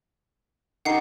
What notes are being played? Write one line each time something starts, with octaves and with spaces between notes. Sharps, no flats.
D#3 D#4 G4 F#5 C7